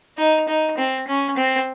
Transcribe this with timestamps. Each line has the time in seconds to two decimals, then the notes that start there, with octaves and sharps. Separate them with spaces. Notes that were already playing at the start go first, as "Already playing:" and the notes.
0.17 D#4
0.48 D#4
0.77 C4
1.07 C#4
1.36 C4